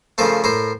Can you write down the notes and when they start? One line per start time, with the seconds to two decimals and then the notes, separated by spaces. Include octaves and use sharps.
0.18 C#3 F3 A3 A#4 C5
0.44 A2 A#4 C5